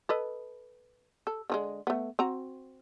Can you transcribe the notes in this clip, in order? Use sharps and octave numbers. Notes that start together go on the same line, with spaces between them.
A4 B4 D#5
A4
D3 F3 G#3
A3 B3
C4 F#4 A#5